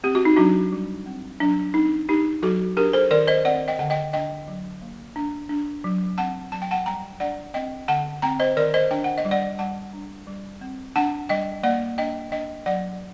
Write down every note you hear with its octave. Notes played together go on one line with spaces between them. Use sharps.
C4 G4
F#4
D#4
F#3 D4 F#4
G3
C4
F#3 D4
C4 D#4
D4 D#4 G4
F#3 F#4 A4
D4 G4 A#4
A4 C5
D#3 A#4 D5
C5 D#5
C4 D5 F#5
D#5 G5
D3 F#5
D#5 G5
D4 D#5 G5
F#3
A#3
D4
D4
F#3
C4 F#5 A5
F#3 A5
G5
F#5 A5
G3 G5 A#5
D4 D5 F#5
C4 D#5 G5
D3 F#5 A5
C4 G5 A#5
C5 D#5
D#3 A#4 D5
C5 D#5
D4 G5
F#5
D#5
G3
D5 F#5
G3 F#5 A5
D4
G3
C4
D4 F#5 A5
G3 D#5 G5
A#3 D5 F#5
D4 D#5 G5
D4 D#5 G5
F#3 D5 F#5